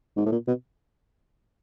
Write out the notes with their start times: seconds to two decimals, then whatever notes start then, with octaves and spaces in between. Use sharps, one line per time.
0.17 G#2
0.26 A2
0.32 A#2
0.48 B2